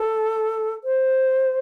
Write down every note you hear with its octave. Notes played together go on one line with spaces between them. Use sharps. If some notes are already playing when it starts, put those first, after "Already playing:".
Already playing: A4
C5